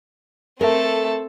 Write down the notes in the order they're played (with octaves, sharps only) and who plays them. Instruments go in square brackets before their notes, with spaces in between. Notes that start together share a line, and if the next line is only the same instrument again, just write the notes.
[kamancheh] A3 [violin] C4 A4 [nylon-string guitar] A#4